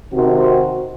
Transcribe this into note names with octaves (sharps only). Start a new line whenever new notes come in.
C3 D#3 C4 F#4